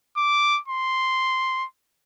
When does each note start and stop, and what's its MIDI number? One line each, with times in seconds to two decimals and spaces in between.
0.17 0.60 86
0.68 1.66 84